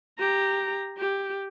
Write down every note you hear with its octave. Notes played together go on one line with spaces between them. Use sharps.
G4 A#5
G4